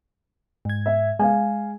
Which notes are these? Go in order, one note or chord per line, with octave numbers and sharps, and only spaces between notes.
G#2 G#6
E5
G#3 F5 G#5